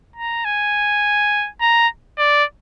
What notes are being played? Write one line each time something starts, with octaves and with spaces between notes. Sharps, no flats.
A#5
G#5
A#5
D5